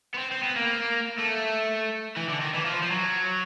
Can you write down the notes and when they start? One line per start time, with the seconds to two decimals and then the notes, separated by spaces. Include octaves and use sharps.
0.14 B3
0.18 C4
0.32 C4
0.43 B3
0.56 A#3
1.18 A3
2.16 E3
2.29 D3
2.40 D#3
2.54 E3
2.65 F3
2.82 F3
2.90 F#3